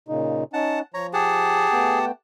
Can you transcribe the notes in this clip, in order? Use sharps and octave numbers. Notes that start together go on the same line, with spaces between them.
A#2 C#3 D#4
C#4 D#4 F#5 A5
F3 C#5 A#5
G4 G#4 F#5 A5
A3 B3 G5